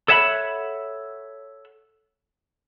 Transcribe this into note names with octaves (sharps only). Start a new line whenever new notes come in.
A4 C#5 E5 F#5 A5 B5